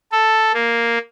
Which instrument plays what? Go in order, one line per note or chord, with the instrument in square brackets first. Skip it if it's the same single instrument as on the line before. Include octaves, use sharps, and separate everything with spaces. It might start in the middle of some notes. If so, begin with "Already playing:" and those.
[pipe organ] A4
A#3